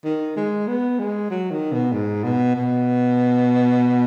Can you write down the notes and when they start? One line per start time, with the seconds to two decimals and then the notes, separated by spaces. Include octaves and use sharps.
0.05 D#3
0.36 G#3
0.67 B3
0.99 G#3
1.30 F#3
1.51 D#3
1.72 B2
1.92 G#2
2.24 B2
2.55 B2